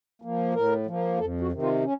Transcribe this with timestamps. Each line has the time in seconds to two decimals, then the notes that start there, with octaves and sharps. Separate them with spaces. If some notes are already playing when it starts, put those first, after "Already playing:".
0.22 F3 A#3
0.54 A2 A#4
0.86 F3 A#3
1.19 F2 A4
1.41 F#4
1.52 C3 D#3
1.62 F4
1.84 C#4